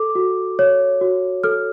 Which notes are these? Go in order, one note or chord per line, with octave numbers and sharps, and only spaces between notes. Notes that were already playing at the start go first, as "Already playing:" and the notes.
Already playing: A4 D6
F#4
C#5
F#4
A4 F6